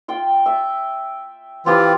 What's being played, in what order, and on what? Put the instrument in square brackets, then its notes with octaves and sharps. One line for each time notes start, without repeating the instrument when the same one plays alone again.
[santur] F4 G5
E5
[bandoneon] E3 F4 [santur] C4 G4